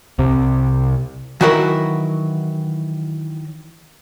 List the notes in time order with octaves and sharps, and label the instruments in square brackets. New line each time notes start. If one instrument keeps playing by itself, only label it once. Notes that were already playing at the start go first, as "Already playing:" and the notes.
[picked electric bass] C2 C3
[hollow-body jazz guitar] D#3 E3 F#3 E4 F#4 A#4